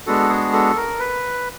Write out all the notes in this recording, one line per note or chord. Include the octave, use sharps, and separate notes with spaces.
G#3 B3 D4 F#4 A4
G#4
A4
A#4
B4